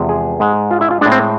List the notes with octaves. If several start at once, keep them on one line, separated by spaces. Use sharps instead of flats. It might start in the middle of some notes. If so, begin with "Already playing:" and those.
Already playing: E2 C3 F3 G#3
G#4
G#2 G#3
F4
E4
F4
A2 G#3 D4
C4